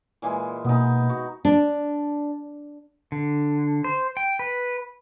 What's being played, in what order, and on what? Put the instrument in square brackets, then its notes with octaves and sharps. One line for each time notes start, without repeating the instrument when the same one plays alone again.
[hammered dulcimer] A#2 E3 G#3
[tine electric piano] B2 A#3 D#6 [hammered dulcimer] B3 D#4
[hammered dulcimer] F#4
[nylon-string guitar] D4
[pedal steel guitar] D3
C5
G5
B4